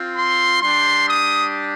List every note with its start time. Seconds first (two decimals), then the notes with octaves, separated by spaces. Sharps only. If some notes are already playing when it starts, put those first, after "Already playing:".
Already playing: C4 F4
0.15 C6
0.61 G3 D4 G4 C6
1.08 D#6